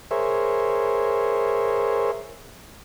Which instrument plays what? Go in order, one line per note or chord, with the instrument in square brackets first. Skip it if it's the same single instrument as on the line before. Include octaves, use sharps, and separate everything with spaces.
[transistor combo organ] G#4 A#4 C5 C#5 E5